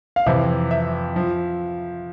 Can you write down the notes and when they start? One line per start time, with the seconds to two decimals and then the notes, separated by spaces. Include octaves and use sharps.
0.16 F5
0.26 F2 C3 E3 E5
0.71 E5
1.16 F3